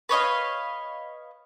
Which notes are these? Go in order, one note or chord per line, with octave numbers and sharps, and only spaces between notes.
B4 C#5 D#5 F5